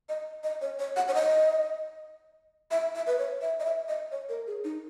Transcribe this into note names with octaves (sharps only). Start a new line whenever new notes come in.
D#5
D#5
C#5
C#5
F#5
C#5
D#5
E5
E5
B4
C#5
E5
D#5
E5
D#5
C#5
A#4
G#4
D#4